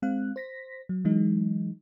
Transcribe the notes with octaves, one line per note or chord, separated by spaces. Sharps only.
G#3 C4 F5 F#6
C5 A#6 B6
F#3
E3 F#3 G#3 D#4